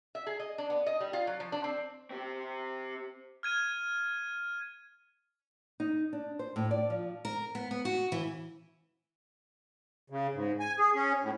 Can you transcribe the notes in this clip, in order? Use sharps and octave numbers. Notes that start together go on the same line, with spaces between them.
E5
G#4
D#5
D4
B3
D#5
G3
F4
F#3
F3
D4
C4
C4 G4
F6 G#6 D#7
D#4
D4
C5
A2
D5
F3
A#4
B3
B3
F#4
E3
C#3
G#2
G#5
G#4
C#4
A2